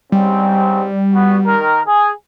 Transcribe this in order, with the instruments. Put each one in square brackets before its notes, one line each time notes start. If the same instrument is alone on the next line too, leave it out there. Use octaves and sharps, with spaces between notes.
[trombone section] G#2 C#3 C4 [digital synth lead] G3
[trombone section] B3 F#4
D#3 A#4
G#4